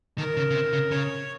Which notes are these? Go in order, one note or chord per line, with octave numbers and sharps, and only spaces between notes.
D#3 A#4
C#3
C#3
C3
C#3
C#3 C#5